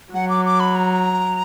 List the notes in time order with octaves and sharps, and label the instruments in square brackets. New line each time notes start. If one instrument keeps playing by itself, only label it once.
[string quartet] F#3 [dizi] F#5
[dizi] D6
D6
B5
A#5